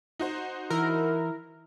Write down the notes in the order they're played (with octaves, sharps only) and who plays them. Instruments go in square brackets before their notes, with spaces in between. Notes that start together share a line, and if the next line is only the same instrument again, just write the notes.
[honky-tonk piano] D#4 F#4 C5
[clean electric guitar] E3 [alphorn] E4 [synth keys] A#4